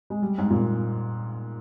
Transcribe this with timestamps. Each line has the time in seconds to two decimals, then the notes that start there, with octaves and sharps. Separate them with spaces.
0.10 G#3
0.22 G3
0.38 G#2
0.50 A#2